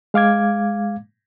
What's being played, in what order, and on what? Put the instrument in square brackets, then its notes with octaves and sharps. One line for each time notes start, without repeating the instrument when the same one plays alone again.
[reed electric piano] G#3 F5 D6 G#6